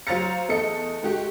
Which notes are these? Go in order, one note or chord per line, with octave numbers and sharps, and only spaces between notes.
F#3 C5 F5 A#5 A6 C#7
E2 A3 A4 D#5 C#7
G#3 A3 F#4 G4